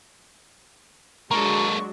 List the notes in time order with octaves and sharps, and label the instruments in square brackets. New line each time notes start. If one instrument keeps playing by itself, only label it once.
[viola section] F#3 G#3 D4 [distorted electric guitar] A#3 A4 [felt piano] A#5 [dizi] C#6